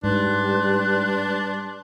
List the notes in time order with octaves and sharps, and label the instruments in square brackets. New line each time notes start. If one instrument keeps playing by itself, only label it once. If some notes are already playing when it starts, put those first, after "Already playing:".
[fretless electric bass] G#2 [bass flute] G3 [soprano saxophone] D4 [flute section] B4 C6 F#6